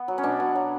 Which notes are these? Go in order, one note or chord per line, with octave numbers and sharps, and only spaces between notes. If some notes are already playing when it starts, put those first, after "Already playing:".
Already playing: B3
F#3
C#4
B2 D4
B2
F#3